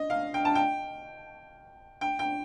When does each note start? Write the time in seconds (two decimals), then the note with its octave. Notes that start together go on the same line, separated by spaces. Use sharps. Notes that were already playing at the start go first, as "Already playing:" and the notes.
Already playing: D#5
0.10 F5
0.34 G5
0.45 A5
0.55 G5
2.01 G5
2.19 G5